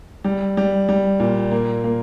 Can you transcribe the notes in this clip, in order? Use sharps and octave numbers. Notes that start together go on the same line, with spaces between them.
G3
G3
G3
A#2
A#3
A#3